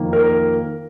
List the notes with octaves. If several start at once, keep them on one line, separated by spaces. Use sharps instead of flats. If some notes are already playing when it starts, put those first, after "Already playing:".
Already playing: F2 D#3 A#3
A#4